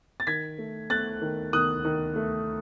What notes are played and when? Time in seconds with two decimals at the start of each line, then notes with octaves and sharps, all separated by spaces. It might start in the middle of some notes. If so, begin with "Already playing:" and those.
0.20 A6
0.27 D#3 G#6 B6
0.58 A3
0.90 A3 F#6 A6
1.22 D#3
1.53 D#3 D#6 F#6
1.85 D#3
2.16 A3